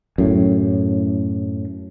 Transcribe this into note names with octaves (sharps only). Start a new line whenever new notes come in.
F#2 A2